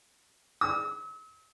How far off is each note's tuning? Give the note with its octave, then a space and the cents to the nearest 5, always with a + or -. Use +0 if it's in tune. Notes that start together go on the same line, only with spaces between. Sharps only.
E6 -45